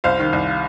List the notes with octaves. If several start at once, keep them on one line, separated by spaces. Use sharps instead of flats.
C2 C5 F5
D#3
C2